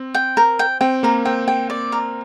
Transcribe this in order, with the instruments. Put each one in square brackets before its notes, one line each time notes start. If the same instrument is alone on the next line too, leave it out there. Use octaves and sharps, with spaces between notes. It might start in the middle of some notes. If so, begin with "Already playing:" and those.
Already playing: [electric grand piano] C4
[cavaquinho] G5
A#4
G5
[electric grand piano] C4 [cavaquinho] G5
[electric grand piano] A#3 [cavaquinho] A#4
[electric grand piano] C4 [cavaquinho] G5
[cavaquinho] G5
D5
A#4